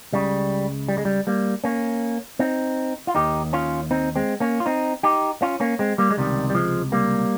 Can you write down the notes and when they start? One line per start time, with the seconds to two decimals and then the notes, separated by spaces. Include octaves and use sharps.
0.13 C#2 C#3 G3
0.88 G3
0.98 G#3
1.05 G3
1.27 G3 A#3
1.64 A#3 C#4
2.39 C4 D#4
3.07 F4
3.15 D#2 D#3 D#4 G4
3.53 C#4 F4
3.91 C4 D#4
4.16 G#3 C4
4.40 A#3 C#4
4.60 F4
4.66 C4 D#4
5.03 D#4 G4
5.42 C#4 F4
5.60 A#3 C#4
5.79 G#3 C4
5.98 G3 A#3
6.11 G#3
6.17 C#2 C3 D#3 G3
6.50 G3
6.55 F3 G#3
6.92 G3 A#3